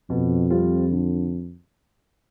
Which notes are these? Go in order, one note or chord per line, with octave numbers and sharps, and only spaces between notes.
F2 B2
G3 C4 F4
D3